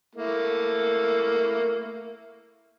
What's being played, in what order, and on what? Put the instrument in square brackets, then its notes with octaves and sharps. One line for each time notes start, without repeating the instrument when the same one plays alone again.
[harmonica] A3 A#3 E4